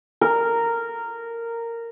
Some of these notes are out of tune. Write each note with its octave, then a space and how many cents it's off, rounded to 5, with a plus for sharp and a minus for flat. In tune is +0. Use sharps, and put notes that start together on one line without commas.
A#4 -10